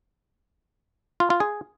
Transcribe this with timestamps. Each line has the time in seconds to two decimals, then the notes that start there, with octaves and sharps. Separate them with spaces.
1.20 F4
1.30 F4
1.40 G#4